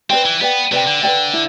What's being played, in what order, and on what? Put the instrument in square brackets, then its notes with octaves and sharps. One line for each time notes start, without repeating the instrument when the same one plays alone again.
[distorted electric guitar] C4 [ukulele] B4 D5 G5
[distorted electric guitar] E3
[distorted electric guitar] B3 [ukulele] B4 D5 G5
[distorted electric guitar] C3 [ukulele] B4 D5 G5
[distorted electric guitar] D3
[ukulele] B4 D5 G5
E4